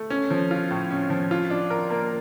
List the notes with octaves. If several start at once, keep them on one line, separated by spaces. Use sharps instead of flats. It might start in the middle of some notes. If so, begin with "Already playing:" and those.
Already playing: A3
C#4
F3
F4
A2
C#4
F3
F4
D4
A#4
A#3